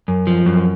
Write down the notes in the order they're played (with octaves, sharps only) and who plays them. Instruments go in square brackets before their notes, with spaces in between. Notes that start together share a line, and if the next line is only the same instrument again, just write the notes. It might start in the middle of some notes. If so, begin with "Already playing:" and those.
[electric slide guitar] F#2
F3
F#2